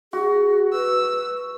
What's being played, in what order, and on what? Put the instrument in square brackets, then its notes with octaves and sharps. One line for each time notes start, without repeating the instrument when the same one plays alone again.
[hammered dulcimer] F#4 [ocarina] G#4
[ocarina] B4 [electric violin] E6